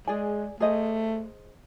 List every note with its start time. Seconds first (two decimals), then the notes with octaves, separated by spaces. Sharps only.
0.07 G#3 G#4 D5 G#5
0.60 A3 G#4 C5 D#5